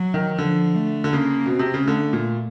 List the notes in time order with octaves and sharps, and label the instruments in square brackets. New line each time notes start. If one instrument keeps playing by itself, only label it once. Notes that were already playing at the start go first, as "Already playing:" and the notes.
Already playing: [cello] F#3
[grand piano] D#3
[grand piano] D3 [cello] F3
[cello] A3
[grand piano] D3
[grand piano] C#3 [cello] A#3
[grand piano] B2 [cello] C4
[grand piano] C3
C#3
[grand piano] D3 [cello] A3
[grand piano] A#2